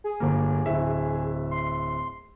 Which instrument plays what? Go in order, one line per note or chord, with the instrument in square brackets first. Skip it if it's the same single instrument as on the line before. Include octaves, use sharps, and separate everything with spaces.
[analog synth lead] G#4
[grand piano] G1 A#3
D1 E5
[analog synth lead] C6